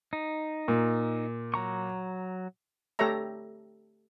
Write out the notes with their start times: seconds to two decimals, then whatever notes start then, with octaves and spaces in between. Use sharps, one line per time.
0.13 D#4
0.68 A#2
1.54 F#3 A#5 C#6
2.99 A3 G4 A4 C#5 E5 A#5